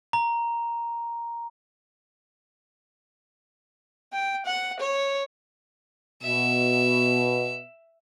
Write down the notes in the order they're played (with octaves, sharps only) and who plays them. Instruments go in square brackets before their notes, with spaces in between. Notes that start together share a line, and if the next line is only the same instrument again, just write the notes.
[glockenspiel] A#5
[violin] G5
F#5
C#5
[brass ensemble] B2 [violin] E5